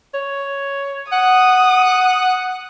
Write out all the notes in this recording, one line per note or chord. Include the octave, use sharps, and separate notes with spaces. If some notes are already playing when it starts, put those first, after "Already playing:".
C#5
F#5 D#6